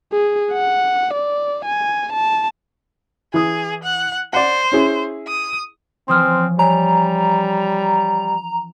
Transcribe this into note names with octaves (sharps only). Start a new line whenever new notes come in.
G#4
F#5
D5
G#5
A5
E3 G#4 D#6
F#5
C5 D5 F#5
C#4 E4 G#4
D#6
E3 F3 C4 C#4 C6 D#6 F6
G3 C#5 G#5 A#5